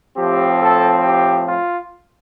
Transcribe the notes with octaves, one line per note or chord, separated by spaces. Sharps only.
A2 F3 C4 G4
A4
G4
F4